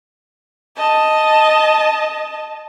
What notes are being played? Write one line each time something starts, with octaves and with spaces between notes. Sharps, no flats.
D#5 A5